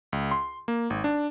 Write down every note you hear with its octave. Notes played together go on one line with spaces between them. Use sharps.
C#2
C6
A#3
G#1
D4